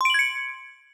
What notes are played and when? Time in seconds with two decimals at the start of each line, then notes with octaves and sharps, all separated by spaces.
0.01 C6
0.05 D7
0.10 F#7
0.14 G#6
0.19 C#7